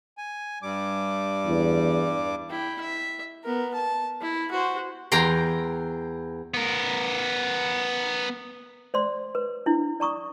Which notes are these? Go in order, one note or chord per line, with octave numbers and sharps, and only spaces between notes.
G#5
G2 G3 D6
E2
E4 G5
E5
B3 A#4
A5
E4
F#4 C5
E2 G5 A#5 C6
B3 A#4
C5 D5 C6
B4
D4 E4
D5 A#5 C#6 D#6